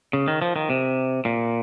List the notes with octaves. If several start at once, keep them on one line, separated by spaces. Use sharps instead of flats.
C#3
D#3
F3
D#3
C3
A#2